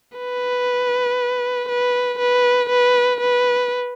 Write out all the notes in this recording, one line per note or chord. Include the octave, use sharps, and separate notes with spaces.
B4
B4
B4
B4
B4